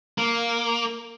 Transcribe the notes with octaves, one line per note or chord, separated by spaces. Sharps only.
A#3